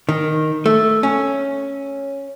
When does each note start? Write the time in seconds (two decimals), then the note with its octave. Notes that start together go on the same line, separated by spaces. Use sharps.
0.09 D#3
0.66 A3
1.03 C#4